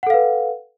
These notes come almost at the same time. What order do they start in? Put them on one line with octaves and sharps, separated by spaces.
F#5 A4 F5 B4